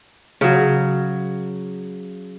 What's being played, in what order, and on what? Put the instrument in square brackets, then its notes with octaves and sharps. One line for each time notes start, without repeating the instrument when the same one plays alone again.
[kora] C#3 F#3